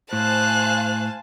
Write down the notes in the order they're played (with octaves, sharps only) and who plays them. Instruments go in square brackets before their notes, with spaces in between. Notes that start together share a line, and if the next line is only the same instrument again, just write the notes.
[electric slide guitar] A2 [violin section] C5 F5 G#5 [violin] A5 [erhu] F#6